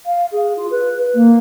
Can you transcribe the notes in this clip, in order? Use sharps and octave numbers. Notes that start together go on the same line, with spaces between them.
F5
G#4
F4
B4
A#3